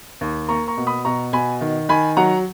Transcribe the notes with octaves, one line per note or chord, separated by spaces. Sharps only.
D#2
A#3 A#5 C#6
A#5 C#6
B2
B5 D#6
B2 A#5 C#6
B2 G#5 B5
D#3
D#3 G#5 B5
F#3 F#5 A#5